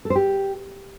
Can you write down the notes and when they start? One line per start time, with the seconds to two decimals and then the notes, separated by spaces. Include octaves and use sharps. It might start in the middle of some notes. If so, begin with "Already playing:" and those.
0.05 A4
0.10 C5
0.15 G4